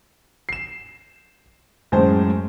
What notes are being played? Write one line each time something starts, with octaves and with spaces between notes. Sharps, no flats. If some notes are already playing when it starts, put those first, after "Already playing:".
C7 E7
F#2 A2 G#3 C5 A5